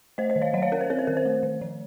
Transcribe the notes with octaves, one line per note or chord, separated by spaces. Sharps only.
A3 C5 D#5
C5 D#5
D#3
C#5 F5
F#3 D#5 F#5
C#5 F5
C#4 A#4
C5
C4 A#4 C#5
C5
D#3 A#4
C5
A3
D#3
F3